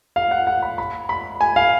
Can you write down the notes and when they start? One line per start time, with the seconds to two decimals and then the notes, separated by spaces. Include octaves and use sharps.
0.16 F5
0.31 F#5
0.47 F#5
0.62 B5
0.78 B5
1.09 B5
1.41 G#5
1.56 F5